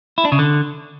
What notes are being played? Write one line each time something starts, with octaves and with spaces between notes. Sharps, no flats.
E4
D4
C#3
D3